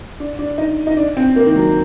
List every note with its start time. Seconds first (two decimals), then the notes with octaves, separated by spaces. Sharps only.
0.20 D4
0.39 D4
0.58 D#4
0.87 D#4
0.97 D4
1.17 C4
1.36 A#3
1.46 D#3
1.56 F#3